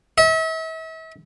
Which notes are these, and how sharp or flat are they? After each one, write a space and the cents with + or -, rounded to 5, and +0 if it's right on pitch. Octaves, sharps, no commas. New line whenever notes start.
E5 -40